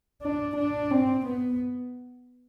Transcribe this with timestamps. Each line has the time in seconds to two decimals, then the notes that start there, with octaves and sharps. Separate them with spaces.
0.22 D4
0.56 D4
0.91 C4
1.26 B3